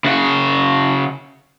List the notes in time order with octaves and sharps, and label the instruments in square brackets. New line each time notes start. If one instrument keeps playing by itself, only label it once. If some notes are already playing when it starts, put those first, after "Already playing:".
[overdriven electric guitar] C#3 F#4